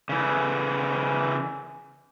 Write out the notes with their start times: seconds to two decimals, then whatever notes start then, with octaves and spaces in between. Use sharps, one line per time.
0.09 C#3 E3